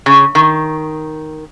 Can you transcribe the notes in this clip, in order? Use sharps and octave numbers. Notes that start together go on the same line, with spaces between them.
C#3
D#3